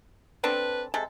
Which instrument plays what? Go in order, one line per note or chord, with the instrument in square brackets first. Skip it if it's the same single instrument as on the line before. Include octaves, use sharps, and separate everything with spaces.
[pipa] C4 D4 A4 [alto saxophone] B4
[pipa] C3 G#3 A4